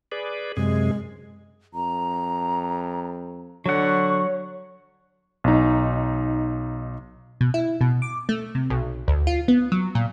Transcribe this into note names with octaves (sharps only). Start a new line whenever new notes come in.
G#4 B4 D5
F#2 C3 G#3 G#4
F2 A#5
D3 F#3 C#5 F#5 C#6
B1 D#4
B2
E4
B2
D6
A3
C3
B1
D2
F4
B3
F#3
A#2